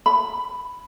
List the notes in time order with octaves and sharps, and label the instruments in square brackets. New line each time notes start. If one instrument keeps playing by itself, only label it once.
[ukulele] B5